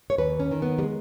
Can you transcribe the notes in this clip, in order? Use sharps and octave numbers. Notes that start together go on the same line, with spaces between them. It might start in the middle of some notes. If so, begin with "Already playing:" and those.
C#5
D#2 B4
C#4
D#3
B3
G3
G#3